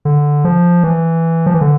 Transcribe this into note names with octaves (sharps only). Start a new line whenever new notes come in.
D3
F3
E3
F3
E3
D3